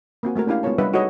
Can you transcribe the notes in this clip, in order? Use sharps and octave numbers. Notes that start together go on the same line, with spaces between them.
A#3 C4 F#4 G#5
G#3 A3 F#4 A#4
C#4 D4 E4 G4 F5
G#3 B3 F4 A#4 C#5 A5
G3 D4 B4 D#5 E5 F#5
D#4 F#4 G#4 A4 C#5 D#5